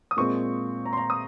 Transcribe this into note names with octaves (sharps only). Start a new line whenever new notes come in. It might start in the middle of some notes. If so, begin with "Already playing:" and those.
D#6
A#2 G#3 C4 C#6
A#5
C6
A#5
D#6